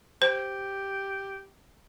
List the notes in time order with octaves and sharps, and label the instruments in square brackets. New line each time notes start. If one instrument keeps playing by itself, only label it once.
[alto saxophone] G4 [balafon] C5